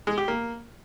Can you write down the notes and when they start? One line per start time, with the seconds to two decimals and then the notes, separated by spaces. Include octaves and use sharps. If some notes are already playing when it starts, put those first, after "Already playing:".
0.07 G#3
0.18 G4
0.28 A#3